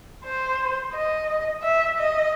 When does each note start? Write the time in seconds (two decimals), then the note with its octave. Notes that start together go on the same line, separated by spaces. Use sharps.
0.25 C5
0.94 D#5
1.62 E5
1.98 D#5